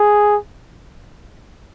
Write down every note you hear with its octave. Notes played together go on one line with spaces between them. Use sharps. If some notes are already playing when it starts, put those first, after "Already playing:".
Already playing: G#4